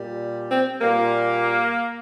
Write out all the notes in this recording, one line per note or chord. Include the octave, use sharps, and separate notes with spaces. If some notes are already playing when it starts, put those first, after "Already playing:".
Already playing: A#2 G3
C4
A#2 G3 A#3